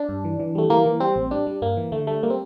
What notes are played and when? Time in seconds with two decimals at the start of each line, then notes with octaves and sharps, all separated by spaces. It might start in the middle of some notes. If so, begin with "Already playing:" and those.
Already playing: D4
0.09 G2
0.24 E3
0.39 E3
0.55 G3 A3
0.70 E3 A#3
0.86 E3
1.00 G3 C4
1.16 A1
1.31 G3 D4
1.46 G3
1.62 G2 A#3
1.77 E3
1.92 D3 A3
2.07 G3 A3
2.23 G3 A#3
2.30 C4